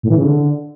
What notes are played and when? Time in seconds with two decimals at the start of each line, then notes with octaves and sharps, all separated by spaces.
0.03 A2
0.10 E3
0.17 C#3
0.24 D3